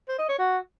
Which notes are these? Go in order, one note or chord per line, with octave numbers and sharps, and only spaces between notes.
C5
D#5
C#5
F#4